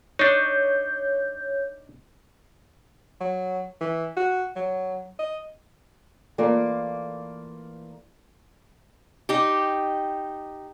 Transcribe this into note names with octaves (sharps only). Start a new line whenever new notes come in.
D4 D#4 C#5 G6
F#3
E3
F#4
F#3
D#5
E3 A3 A#3 F4 D5
D#4 G4